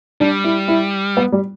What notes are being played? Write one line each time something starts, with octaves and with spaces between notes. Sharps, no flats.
G3 D4
E4
E4
B3
G3